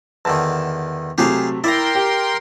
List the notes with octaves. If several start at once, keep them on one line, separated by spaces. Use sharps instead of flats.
E2 D3 D#3 A5
C3 F#3 A3 G4 G#4 F5
E4 A#4 D5 E5 G5 A#5 C6
G4